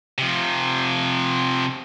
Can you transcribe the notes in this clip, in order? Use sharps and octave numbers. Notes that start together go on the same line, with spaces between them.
C3 F3